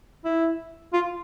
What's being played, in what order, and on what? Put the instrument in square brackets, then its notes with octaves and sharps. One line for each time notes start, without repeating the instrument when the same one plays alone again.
[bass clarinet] E4
F4